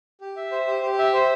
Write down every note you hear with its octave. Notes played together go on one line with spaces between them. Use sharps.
G4
E5
C5
G4
G4
E5
C5